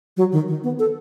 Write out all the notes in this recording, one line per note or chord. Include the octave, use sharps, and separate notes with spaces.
F#3
D#3
D#3
B3
A4